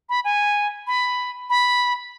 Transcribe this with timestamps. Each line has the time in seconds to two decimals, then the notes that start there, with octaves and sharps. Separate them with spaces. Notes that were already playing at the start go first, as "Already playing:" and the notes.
0.09 B5
0.24 G#5
0.87 B5
1.50 B5